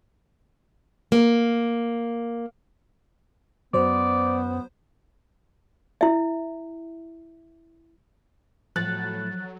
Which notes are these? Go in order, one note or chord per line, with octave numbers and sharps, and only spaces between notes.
A#3
F#2 F#3 B3 C5 D5
E4 E5
A2 F3 F#3 F#6 A6